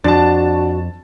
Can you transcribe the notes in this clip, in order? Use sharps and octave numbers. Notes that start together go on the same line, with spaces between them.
F2 D4 F#4 A5 A6